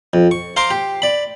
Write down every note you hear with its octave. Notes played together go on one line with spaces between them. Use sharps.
F2
C#6
C5 F5 A#5 C6 D6
G4
D5 B5